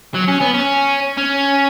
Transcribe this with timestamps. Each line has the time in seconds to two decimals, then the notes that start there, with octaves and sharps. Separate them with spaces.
0.15 F#3
0.28 C#4
0.41 B3
0.54 C#4
1.17 C#4